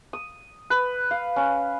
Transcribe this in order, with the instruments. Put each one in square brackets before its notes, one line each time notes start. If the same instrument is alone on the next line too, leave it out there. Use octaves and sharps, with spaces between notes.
[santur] D#6
B4
F5
C#4